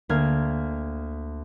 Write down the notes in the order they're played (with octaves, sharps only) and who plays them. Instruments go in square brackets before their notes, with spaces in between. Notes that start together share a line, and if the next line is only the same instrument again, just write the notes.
[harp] D2 A#3 F6 G#6